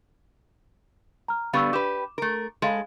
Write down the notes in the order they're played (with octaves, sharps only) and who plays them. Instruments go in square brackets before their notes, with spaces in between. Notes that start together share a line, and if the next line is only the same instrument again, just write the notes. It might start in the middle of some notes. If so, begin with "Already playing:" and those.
[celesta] A#5 F6
[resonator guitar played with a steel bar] D3 G3 B3 [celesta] F5 C#6 E6
[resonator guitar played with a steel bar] G4 B4 [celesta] D6 E7
[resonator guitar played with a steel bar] A3 A#4
[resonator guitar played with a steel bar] G#3 A4 [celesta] C#5 F5 B5